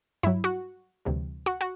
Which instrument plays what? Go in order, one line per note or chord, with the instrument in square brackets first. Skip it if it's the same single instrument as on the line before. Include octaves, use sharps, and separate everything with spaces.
[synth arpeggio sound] G2 F#3 E4
F#4
D2 C3 E3 G3
F#4
F#4